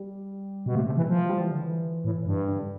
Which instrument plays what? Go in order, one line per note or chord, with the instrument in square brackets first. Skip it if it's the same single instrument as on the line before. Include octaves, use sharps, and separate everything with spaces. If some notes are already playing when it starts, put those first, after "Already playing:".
Already playing: [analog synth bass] G3
[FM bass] B2
[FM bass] C3 [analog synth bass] A3
[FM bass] C3
[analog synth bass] A3
[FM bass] E3
[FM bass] F3 [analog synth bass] G3
[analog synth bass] G3
E3
D3
E3
[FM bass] A2
G2
[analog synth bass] D3